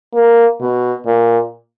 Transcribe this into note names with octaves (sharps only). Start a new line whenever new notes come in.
A#3
B2
A#2